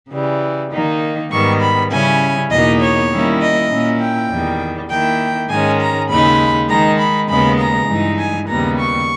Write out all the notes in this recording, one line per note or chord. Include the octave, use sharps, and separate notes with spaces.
C#3 E3 G3
D#3 A#3 D#4
G#2 D#3 G3 B3 C#6
B5
C#3 G3 C#4 E4 G#5
E2 B2 A#3 D#4 D#5
C#5
D#3 G3 A#3 C#4 E4
D#5
A#2 A#3 C#4 E4
G5
E2 D#3 G3
D#3 A#3 E4 G5
G#2 D#3 G#3 C#4 G#5
A#5
D#2 C#3 G#3 D#4 B5
D#3 G#3 D#4 A#5
B5
D#2 C#3 G#3 B3 B5
A#5
G2 E3 G#3 D#4
G#5
D#2 C#3 G3 B3 A#5
C#6